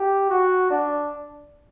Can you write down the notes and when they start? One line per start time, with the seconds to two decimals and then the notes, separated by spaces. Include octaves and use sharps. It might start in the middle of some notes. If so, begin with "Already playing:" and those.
Already playing: G4
0.29 F#4
0.71 D4